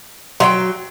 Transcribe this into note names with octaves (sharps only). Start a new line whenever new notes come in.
F#3 E5 G5 C6